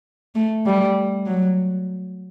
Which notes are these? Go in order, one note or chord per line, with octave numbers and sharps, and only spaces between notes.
A3
G3
F#3